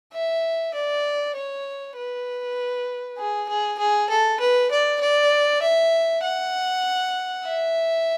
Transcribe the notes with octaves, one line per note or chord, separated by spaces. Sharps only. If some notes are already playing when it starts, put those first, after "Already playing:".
E5
D5
C#5
B4
G#4
G#4
G#4
A4
B4
D5
D5
E5
F#5
E5